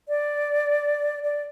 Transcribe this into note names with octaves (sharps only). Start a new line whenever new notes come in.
D5
D5